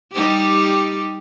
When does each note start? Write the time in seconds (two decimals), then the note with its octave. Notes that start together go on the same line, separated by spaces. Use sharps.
0.13 G3 D#4 G4